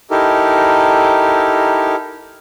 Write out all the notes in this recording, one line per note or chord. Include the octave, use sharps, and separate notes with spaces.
D#4 E4 G4 A4 A#4